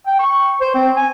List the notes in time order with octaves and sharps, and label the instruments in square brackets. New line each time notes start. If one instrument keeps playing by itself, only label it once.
[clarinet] G5
C#6
C5
C4
G#5